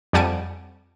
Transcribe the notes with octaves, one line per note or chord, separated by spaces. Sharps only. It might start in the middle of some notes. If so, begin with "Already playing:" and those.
F2 G3 F#5 G#5 A5 D7